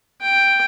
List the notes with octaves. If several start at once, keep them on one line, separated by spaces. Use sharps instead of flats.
G5